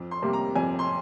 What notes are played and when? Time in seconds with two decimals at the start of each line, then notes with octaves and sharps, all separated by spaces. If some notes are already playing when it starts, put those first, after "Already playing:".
Already playing: F2
0.11 C6
0.22 C3 G3 A#3
0.33 A#5
0.56 F2 G#5
0.79 C6